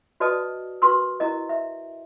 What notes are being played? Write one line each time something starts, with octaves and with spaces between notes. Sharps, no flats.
F#4 B4 D5 D#5 A5 D#6
F#4 A#4 B4 C6 C#6 E6
E4 A#4 D#5
E5